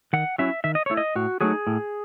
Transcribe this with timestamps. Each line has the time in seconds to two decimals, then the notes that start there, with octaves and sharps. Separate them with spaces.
0.13 D#3 F#5
0.38 F#3 C#4 E4 E5
0.64 D#3 E5
0.75 D#5
0.86 A3 E4 C#5
0.97 D#5
1.15 A2 F#4
1.41 F#3 A3 D#4 G#4
1.67 A2